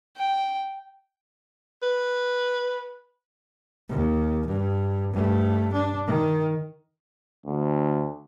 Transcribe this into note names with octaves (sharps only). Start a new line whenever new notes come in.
G5
B4
D#2
G2
G2 A3
D4
D#3
D2